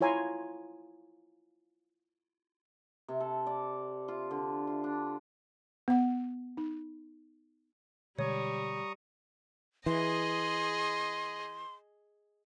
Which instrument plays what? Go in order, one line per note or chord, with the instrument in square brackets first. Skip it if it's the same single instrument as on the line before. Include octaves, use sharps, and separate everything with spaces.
[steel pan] E4 F4 C#5 G#5 A#5 C6
[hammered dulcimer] C3
A4
D5
F4
D3
F4
D4
[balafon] B3 F#5
D#4
[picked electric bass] B2 D3 G#3 [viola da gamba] G3 [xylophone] C#5 [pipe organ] A#5 C#6 D#6
[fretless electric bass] E3 [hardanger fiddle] G#4 D#5 [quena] C6